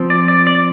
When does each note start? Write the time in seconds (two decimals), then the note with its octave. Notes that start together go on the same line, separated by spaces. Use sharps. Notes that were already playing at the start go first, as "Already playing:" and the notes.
Already playing: F3 C4
0.10 D5
0.28 D5
0.47 D5